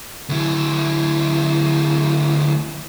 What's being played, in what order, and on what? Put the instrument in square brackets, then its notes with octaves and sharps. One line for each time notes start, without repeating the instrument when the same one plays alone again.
[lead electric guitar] D2 E4